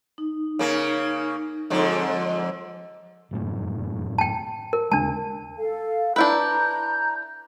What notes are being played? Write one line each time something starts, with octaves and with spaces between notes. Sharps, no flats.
D#4
C#3 A#3
F2 G#2 D3
F1 F#2 A2
G5 A5
A#4
D#2 C#3 G#3 D4 A5
A4 F5
D4 E4 B4 A#5 G6